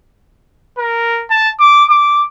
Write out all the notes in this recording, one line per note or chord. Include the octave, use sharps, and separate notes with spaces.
A#4
A5
D6
D6